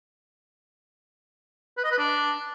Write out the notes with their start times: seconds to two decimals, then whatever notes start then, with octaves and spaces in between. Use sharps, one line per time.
1.77 B4
1.84 D#5
1.91 B4
1.98 D4